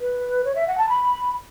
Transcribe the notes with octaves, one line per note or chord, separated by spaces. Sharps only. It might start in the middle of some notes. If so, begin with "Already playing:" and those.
B4
C#5
E5
F#5
A5
B5